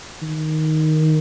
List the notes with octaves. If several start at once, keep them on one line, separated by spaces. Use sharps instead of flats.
D#3